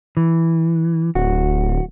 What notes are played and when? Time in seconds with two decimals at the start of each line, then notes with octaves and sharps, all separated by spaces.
0.17 E3
1.15 D1 F#4